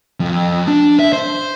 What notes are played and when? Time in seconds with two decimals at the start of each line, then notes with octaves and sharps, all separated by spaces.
0.20 F2
0.67 D4
0.99 E5
1.13 C5